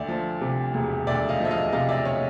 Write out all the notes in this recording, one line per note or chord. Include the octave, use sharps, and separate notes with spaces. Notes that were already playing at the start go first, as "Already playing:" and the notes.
Already playing: D2 D5 E5
F3
C3
E1
D2 D5 E5
D#5 F5
F3 E5
D#5 F5
C3 D#5 F5
D5 E5
C#5 D#5